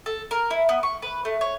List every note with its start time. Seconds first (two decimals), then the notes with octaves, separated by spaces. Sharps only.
0.06 A4
0.31 A#4
0.51 E4
0.69 B3
0.83 C#6
1.02 B4
1.25 A3
1.41 C#5